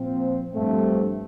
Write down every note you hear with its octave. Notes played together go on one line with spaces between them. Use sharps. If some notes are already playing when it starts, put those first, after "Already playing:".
Already playing: A#2 F3 C4
G2 F3 A3 C4